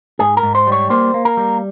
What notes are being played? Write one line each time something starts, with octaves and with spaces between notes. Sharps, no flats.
G#2 G#4
A#4
G#2
C5
G3 C#5
A#3 C5
A#3
A#4
G3